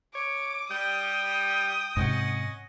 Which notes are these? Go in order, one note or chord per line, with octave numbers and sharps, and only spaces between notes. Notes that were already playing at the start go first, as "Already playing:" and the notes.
C#5 D6
G3 G5 D#6
G#2 C3 C#4 D#5 F#5